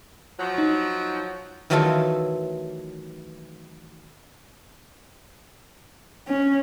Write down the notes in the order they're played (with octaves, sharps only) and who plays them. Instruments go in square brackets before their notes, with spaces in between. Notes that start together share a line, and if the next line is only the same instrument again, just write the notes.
[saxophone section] F3 F#3
[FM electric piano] D#4
[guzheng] D#3 E3 F#3 A3 F4 A4
[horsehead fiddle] C#4